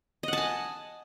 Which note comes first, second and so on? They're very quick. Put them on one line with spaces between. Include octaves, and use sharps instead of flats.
D#5 F#5 A5 G#5